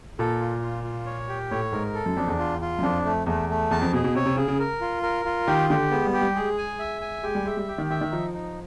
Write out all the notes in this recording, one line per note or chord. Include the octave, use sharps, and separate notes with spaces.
A#2 A4
F4
F4
F4
C#5
G4
A2 C#5
G#2 A#4
A4
F#2
F2 D4
E2
F4
F4
F#2
F2 D4
A3
E2 A3
A3
E2 A5
F2
B2 G#4
B2
C3 C#5
C3
C#3 G#4
C#3
A#4
F4
A#4
F4
D#3 G4
D3 G4
G#3 B3
G3
G4
G3
G#3 G#4
G#5
E5
G#5
G#3 G4
G3
G#3 E5
G3
G4
D#3
D#3 E5
D#3
F3 D#4
D#4